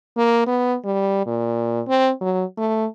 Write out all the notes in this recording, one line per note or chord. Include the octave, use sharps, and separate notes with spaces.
A#3
B3
G3
A#2
C4
F#3
A3